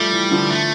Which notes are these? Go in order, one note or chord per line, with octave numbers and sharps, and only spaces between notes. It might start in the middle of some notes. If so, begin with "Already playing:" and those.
Already playing: F3 G3 A3
E3
D3 F3
A3